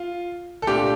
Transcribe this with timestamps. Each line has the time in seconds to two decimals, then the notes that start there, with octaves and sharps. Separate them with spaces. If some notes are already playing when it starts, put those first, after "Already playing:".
Already playing: F4
0.62 A4
0.67 A#2 A3 D4 G4